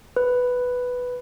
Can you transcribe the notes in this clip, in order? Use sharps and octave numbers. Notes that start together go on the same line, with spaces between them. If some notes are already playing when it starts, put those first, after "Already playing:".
B4